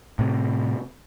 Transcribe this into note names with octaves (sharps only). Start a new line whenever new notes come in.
A2 C3